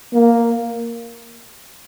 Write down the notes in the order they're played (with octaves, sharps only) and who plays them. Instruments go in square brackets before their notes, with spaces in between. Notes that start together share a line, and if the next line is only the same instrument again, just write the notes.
[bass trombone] A#3